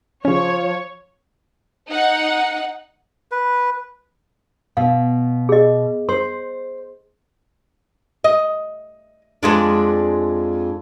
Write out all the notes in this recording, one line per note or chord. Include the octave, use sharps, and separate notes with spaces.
C#3 F3 C#4 C#5
D#4 F#5
B4
B2 F5
G#4 D#5
C5 C6
D#5
F2 G#3 D4